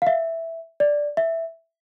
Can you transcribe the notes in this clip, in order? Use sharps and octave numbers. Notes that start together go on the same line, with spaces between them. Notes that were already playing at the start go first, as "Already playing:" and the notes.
F5
E5
D5
E5